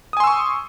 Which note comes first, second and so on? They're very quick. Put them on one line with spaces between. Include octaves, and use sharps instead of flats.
D#6 G#5 C6 E6 C#6